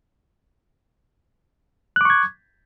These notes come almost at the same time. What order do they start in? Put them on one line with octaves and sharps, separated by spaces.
F#6 D6 C#6 G#6